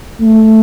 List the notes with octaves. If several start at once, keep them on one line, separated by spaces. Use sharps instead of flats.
A3